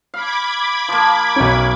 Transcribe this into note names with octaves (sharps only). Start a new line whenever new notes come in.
F5 B5 D6 G#6
F3 A#3
B1 C#4